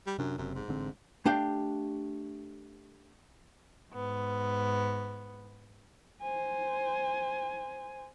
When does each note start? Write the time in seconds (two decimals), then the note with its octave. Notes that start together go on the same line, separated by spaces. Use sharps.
0.07 G3
0.19 F#2 C3 D4
0.38 F#1 F#2 C3
0.55 G#2
0.68 A1 D3 C4
1.26 A3 D4 G4 F5 G5
3.92 G#2 B3
6.21 C5 G#5